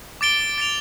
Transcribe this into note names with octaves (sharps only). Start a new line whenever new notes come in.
D6 A6 D7 G7
A6 D7 F7